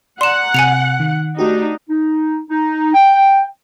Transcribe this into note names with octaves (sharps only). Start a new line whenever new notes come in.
D5 F#5 A#5 C6 E7
C3 G#5 C#7 F7
D#3
A3 D4 D#4 F#4 G4
D#4
D#4
G5